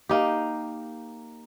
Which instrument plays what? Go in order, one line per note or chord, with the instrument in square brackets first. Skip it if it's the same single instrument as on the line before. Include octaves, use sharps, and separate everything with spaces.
[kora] A#3 D#4 G4